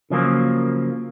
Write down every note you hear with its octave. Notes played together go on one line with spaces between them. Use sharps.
C#3 F3 F#3 A#3